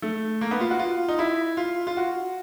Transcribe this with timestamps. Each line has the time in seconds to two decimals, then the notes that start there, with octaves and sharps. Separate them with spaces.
0.02 A3
0.41 A#3
0.51 B3
0.60 F4
0.71 F#4
0.79 F4
1.08 D#4
1.19 E4
1.57 F4
1.87 F4
1.97 F#4